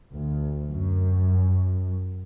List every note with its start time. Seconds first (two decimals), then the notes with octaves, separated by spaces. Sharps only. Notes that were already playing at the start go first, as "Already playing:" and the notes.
0.13 D2
0.72 F#2